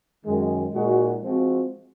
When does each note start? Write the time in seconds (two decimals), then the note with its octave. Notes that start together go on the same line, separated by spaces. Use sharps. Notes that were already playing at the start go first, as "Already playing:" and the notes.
0.24 F#2 D#3 G#3
0.73 A#2 G#3 D#4 F#4
1.21 F3 G#3 C4 F#4